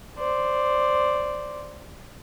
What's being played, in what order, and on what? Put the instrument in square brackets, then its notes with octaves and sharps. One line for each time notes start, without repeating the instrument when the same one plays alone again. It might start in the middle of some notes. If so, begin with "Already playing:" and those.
[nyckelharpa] C5 D5